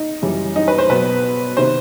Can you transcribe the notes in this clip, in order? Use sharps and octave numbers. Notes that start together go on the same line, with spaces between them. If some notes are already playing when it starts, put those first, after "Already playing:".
Already playing: D#4
F#2 E3 G3
D#4
B4
C5
B2 F#3 B3 B4
C3 D#3 C5